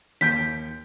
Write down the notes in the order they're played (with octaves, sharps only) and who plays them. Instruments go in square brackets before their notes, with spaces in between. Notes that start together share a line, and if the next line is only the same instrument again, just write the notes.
[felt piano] D#2 G6 D7 [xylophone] B6